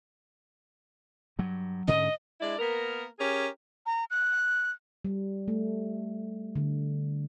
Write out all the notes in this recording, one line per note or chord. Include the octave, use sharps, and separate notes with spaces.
G2 F#3
G#2 D3 C#4 D#5
G#3 D4 E4 D5
A#3 B3 A#4
C#4 G4 G#4 A#4
A#5
F#6
G3
A3
D3